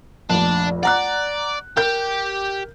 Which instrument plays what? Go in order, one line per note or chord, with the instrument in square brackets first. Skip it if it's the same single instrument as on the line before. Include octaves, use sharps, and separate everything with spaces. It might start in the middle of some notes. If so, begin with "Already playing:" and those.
[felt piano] F1 A#1 [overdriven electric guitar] D4
[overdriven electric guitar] D5 [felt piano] F#5 A#5 F#6
[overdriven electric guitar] G4 [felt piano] A#4 G6